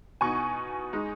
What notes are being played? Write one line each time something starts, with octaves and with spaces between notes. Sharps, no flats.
B2 B3 D#4 G#5 C#6
G#3 D#4